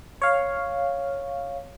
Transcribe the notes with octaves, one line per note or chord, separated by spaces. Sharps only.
C#5 F5